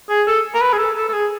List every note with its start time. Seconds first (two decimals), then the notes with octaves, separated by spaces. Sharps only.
0.10 G#4
0.27 A4
0.54 A#4
0.61 B4
0.73 G#4
0.79 A4
0.96 A4
1.09 A4
1.13 G#4